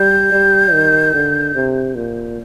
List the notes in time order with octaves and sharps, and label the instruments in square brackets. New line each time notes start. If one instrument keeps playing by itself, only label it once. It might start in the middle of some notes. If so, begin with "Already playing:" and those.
Already playing: [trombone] G3 [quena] G6
[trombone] G3
D#3
D3
C3
A#2